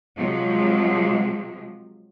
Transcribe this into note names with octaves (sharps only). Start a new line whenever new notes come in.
C3 F3 F#3 G#3